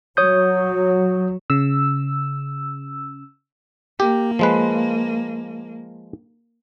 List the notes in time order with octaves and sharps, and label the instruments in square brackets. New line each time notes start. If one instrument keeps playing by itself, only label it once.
[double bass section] F#3 [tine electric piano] C#5 D#6 G6
[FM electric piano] C#3 E6
[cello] A#3 [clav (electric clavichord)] G4
[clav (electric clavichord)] F3 G#3 B4